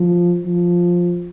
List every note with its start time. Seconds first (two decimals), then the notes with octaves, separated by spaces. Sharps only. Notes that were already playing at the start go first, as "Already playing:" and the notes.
Already playing: F3
0.46 F3